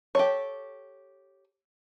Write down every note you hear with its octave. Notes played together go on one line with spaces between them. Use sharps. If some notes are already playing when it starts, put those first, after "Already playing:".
G4 A4 C#5